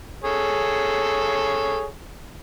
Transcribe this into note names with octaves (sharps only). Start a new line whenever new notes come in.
G#4 A4 C#5